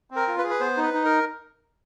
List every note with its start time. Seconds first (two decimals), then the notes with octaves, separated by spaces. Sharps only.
0.11 C4
0.16 A#4
0.27 F4
0.38 B4
0.44 G#4
0.50 B4
0.60 B3 C5
0.77 D#4
0.83 B4
0.93 D#4
1.05 A#4